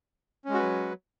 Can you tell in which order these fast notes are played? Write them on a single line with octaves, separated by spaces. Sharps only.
C#4 G#3 F#4 B4 F#3